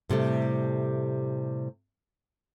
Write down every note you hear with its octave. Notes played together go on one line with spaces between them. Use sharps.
A2 C3 G3 A3